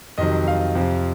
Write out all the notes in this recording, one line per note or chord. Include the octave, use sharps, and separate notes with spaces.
F2 C3 D#3 F#3 D#5
F5
F2 C3 F3